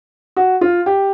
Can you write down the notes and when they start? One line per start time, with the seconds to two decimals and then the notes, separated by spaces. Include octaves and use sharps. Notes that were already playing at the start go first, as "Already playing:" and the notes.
0.37 F#4
0.61 F4
0.86 G4